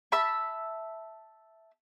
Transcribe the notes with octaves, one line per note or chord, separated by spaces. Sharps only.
E5 A5 B5 E6